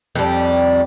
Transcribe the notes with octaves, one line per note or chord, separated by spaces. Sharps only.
F2 G3